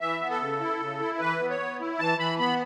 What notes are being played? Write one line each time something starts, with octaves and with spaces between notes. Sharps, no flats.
E3 E5
B3
A4
C#3
E4
C#3
E4
E3 B4
B3
C#5
B3
E4
E3 A5
E3 B5
B3 B5